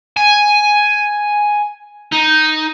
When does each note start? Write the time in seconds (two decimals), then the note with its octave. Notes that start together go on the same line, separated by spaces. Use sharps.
0.17 G#5
2.12 D#4